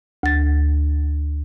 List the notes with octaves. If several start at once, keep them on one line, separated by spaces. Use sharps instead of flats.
D2 A6